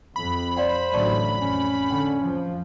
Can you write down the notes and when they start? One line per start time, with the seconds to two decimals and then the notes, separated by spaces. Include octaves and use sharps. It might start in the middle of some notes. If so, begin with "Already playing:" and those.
0.16 F2 B5
0.57 C5 D5 F5 G5
0.93 A1 D2 F#3 D5 A5 C#6
1.41 F2 C#4
1.91 D3 G5
2.24 F2 F3